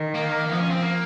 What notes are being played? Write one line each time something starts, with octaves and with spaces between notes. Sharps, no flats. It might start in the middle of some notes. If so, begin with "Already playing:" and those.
Already playing: D#3
A#3
F3 B3
C#4
C4
A#3